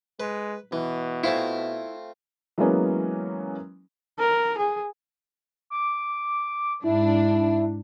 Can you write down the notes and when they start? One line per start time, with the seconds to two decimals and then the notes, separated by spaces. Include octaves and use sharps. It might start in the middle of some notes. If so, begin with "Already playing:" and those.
0.20 G#3 B4
0.72 B2 E3
1.23 A3 C4 E4 F4
2.58 E3 F#3 G#3 A#3 B3 C#4
4.19 A#4
4.58 G#4
5.70 D6
6.84 G#2 D4 E4